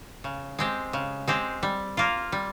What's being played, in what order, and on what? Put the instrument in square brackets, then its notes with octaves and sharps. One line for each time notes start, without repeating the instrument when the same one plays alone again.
[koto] C#3
G#3 C4 G4
C#3
G#3 C4 G4
G3
A#3 F4
G3